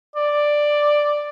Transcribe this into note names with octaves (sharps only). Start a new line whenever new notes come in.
D5